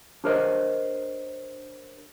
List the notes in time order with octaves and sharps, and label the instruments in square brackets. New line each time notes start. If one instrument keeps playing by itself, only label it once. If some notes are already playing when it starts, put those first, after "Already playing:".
[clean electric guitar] D4 G4 A#4 C5 C#5 D#5